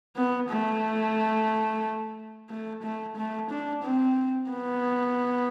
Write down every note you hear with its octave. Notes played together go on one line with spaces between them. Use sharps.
B3
A3
A3
A3
A3
D4
C4
B3